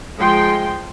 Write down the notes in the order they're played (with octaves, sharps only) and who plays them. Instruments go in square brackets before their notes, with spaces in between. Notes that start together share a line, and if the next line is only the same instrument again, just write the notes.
[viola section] F3 G#3 G5 C6